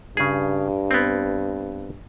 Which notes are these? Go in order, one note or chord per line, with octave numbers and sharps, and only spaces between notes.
G2 C#3 G#4
B3 C4